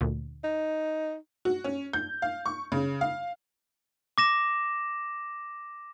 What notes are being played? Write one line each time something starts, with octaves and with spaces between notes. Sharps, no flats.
D2 A#2
D#4
F#4
C#4
G6
F5
C#6
C#3
F5
D6 A#6 E7